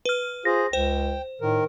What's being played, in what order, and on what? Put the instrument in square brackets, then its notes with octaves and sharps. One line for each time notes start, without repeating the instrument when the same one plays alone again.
[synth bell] B4 F6
[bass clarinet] F4 [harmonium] G#4 C5 [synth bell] A#6
[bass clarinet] C#2 [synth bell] C5 [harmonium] G5
[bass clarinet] A2 [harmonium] D#3 A#4